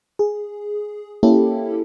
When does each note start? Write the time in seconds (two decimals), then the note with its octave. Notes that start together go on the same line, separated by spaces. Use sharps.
0.19 G#4
1.23 A#3 C#4 E4 G4 A4